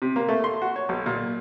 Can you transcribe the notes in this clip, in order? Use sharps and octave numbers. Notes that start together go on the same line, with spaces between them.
C3
A#3
A3
C6
F#4
C#5
B1
A#2